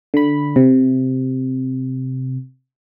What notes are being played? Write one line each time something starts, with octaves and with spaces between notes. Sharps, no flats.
D3 B5
C3